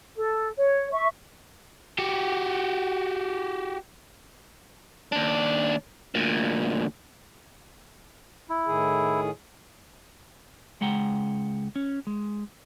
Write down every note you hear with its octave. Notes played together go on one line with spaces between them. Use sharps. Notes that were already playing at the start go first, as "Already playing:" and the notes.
A4
C#5
E5 C#6
F#4 G4
D#2 D4
D2 A#2
E4
A2 D#3 G#4
C#2 G#3 F#5 G5 A#5
C#4
G#3